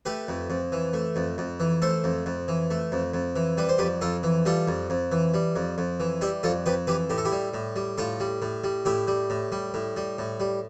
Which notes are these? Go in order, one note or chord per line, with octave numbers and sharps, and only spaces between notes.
A3 G4 B4
F2
F2
E3
A3
F2
F2
E3
A3 A4 C5
F2
F2
E3
A3
F2
F2
E3
G3 B4
C5
F2 G4 B4
F2 F4 A4
E3
G3 F4 A4
F2
F2
E3
G3
F2
F2
E3
G3 E4 G4
F2 F4 A4
F2 G4 B4
E3 G4 B4
A2 G4
A4
E4 G4
G3
A2
G3
A2 F4 A4
G3
A2
G3
A2 E4 G4
G3
A2
G3
A2
G3
A2
G3